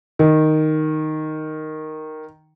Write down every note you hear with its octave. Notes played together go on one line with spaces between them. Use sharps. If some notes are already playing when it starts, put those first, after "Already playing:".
D#3